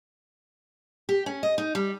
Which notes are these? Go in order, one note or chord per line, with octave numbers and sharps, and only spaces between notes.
G4
C#4
D#5
D#4
G3